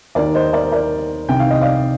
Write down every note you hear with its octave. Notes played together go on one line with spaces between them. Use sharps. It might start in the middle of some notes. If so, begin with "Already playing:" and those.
D#2 D#3 A#4 D5
C5 D#5
A#4 D5
A#4 D5
C2 C3 D#3 G5
F5
D#5
D5 F5